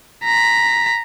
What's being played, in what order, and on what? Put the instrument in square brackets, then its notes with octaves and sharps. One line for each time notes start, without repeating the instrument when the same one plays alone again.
[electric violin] A#5 B6